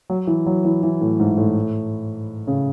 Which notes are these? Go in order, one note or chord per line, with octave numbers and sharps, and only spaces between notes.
F#3
E3
F#3
E3
E3
A2
G#2
A2
C#3